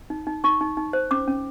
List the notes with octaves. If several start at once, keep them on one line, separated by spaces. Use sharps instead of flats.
D#4
D#4
D#4 C#6
D#4
D#4
C5
C#4 D6
C#4